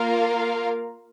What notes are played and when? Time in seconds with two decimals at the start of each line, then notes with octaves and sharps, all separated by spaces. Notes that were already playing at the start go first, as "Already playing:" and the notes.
Already playing: A#3 F4 A#4 F5